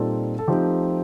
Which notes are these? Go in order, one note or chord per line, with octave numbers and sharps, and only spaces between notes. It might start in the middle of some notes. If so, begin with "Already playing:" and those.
Already playing: A#2 G3 C4 D#4 A4
A4
F3 A3 C4 D#4 G4